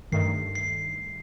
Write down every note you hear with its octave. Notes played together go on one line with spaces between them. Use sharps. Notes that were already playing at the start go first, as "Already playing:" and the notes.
G2 D#3 A3 C7
C7